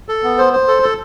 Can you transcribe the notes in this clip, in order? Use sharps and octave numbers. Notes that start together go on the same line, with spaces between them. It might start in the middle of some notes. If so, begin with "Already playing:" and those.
A4
B3
C5
C5
A4
A4